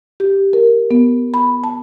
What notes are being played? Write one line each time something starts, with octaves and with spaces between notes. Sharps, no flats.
G4
A#4
B3
B5
A5